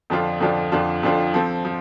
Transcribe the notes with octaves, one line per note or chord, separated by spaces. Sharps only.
F2 D3 F3 D4 F4
F2 D3 F3 D4 F4
F2 D3 F3 D4 F4
F2 D3 F3 D4 F4
F3 C4 A4
F3